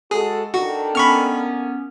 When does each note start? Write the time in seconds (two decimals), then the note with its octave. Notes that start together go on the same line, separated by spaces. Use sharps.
0.11 G#3 F#4 G#4 A4
0.54 D#3 D4 F#4 A4
0.95 A#3 B3 C#4 B5 C#6 F6